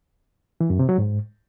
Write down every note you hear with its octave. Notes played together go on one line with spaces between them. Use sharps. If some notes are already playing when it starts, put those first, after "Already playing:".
E3
F#2
C3
F#3
G#2